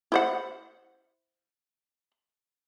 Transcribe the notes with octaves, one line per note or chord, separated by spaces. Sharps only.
E4 C5 F#5